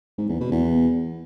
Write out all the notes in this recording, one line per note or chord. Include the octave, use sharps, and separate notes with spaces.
G#2
E2
B2
E2